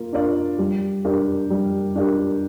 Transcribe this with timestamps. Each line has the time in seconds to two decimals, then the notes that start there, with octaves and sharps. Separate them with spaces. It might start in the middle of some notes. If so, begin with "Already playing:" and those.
Already playing: A#3 F4
0.13 D4 F4 A#4 D5
0.58 G3
1.05 D4 G4 A#4
1.50 G3
1.95 D4 G4 A#4